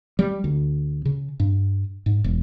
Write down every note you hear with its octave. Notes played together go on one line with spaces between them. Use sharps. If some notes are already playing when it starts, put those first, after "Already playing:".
G3
D2
C#3
G2
G#2
E1